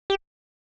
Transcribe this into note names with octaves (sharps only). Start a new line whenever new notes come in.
G4